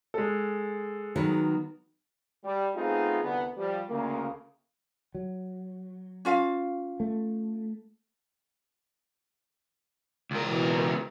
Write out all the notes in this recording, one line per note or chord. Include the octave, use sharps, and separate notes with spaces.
G#3 A4
D#3 F#3 B3
G3
A3 B3 C4 D#4 F4 G#4
C2 D3 B3
F3 G3
D2 C#3 A#3
F#3
C#4 F4 F5
A3
C#2 A#4
B2 E3